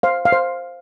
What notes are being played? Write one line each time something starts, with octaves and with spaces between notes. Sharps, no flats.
C5 F5
F5
C5